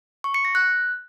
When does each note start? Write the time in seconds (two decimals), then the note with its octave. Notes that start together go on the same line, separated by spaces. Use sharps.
0.24 C#6
0.34 C#7
0.45 A#6
0.55 F#6